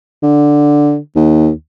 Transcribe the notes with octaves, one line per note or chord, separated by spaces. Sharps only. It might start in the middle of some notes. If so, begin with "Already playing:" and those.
D3
D#2